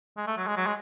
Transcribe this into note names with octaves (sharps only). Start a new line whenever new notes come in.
G#3
A3
F#3
G#3
F#3
G#3